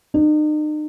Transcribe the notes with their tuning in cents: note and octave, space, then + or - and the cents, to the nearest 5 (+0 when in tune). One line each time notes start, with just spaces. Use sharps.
D#4 -40